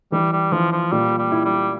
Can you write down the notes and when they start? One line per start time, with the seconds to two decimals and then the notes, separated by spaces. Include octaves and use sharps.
0.12 E3 G3
0.32 G3
0.52 E3 F3
0.72 F3
0.92 A#2 G3
1.19 G3
1.32 E4
1.45 G3